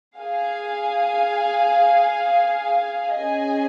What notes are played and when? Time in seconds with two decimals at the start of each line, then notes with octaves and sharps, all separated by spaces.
0.17 G#4 F5 G#5
3.14 C#4 G#4 D#5 G#5